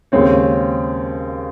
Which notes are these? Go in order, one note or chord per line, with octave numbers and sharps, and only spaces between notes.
D#2 C#3 G#3 C4 C#5